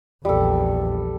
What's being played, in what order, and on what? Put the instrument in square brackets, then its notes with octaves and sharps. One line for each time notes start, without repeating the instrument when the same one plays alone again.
[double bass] A#1 E2 [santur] G3 A4